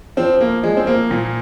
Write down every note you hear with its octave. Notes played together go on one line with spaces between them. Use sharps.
F3 C4
A#3
F3 G#3
C4
A#3
A#2